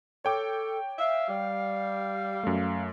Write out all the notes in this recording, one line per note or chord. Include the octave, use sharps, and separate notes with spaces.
A4 C#5 G5 D6
E5 F5
G3
F#2 A3